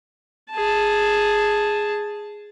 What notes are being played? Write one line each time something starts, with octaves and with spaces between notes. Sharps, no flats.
G#4 A5